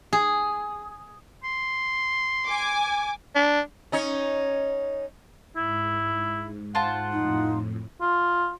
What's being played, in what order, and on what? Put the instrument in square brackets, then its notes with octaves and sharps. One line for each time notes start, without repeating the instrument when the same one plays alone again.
[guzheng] G#4
[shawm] C6
[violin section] G#5 D6
[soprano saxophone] D4
[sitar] C#4 D#4 C#5
[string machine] G#2 [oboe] E4
[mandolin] F4 C5 A5 [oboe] F#5
[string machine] F2 A2 [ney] D#4
[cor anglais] F4